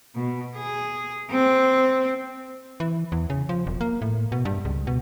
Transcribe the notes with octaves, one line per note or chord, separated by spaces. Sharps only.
B2
G#4
C4
E3
E2
C#3
F3
E1
A#3
A2
B2
G2
C#2
B2